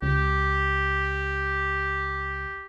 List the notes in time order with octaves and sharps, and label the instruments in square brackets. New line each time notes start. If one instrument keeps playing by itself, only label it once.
[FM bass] C#2 [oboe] G4